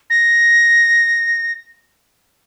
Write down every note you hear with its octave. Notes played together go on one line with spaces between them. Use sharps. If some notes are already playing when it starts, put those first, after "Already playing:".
A#6